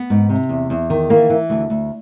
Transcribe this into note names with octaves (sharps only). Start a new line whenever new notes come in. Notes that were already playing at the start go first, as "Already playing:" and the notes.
Already playing: B3
G#2
C3
E2
E2
D#3
E3 A#3
E3
D2
D2